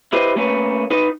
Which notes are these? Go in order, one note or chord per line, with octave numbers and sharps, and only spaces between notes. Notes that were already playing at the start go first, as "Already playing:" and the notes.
E4 G4 B4 C5 D#5
A3 A#3 C#4 B4 C#5
D#4 B4 D#5